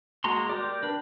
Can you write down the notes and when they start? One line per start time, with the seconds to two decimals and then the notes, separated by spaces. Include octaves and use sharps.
0.24 G#3 A#3 F#4 A#5 C6
0.49 G4 A#4 D5
0.83 D4 B4